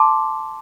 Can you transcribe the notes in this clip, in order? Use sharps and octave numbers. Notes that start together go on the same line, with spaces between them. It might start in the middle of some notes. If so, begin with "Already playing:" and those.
Already playing: A5 C6 D6